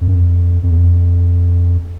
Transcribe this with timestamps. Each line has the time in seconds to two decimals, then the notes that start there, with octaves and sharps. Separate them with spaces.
0.01 F2
0.08 F#2
0.15 F2
0.63 F2
0.71 E2
0.77 F2